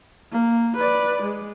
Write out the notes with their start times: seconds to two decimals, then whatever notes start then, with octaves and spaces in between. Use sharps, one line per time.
0.32 A#3
0.76 B4 D5
1.22 G#3